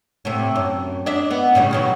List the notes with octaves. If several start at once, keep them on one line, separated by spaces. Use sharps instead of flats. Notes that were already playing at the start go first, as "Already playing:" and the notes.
A2 C3
F#2
D4 D#5 E5
B3
A2 C#3 G3
B2 D#3 F#3